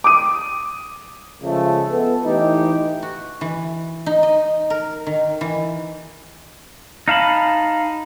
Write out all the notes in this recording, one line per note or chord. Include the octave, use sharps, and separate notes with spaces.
D6 D#6 D#7
C#3 F3 G#3 A3
B3 A4
A2 E3 D#4 G4
F#4
E3
D#4
D#5
A#4
D#3
E3
D#4 F5 A5 B5